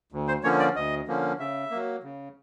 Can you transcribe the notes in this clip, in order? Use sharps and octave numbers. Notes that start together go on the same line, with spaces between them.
D2
C5
D3 F3 A#3 C#4 C#5
D5
D2 D#5
D3 F3 A#3 C#4
C#3 E5
F#3 A#3
C#3